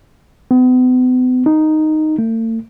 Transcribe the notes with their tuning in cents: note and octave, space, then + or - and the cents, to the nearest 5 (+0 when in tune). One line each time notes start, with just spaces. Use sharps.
B3 +40
D#4 -5
A3 +40